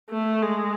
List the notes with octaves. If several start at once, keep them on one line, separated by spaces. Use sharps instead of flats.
A3
G#3